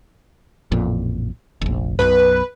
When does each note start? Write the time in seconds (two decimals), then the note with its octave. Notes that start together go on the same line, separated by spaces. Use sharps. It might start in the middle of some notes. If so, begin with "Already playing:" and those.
0.72 A1 F2 A#2
1.62 F1 A#1
1.99 B1 F#2 B2 B4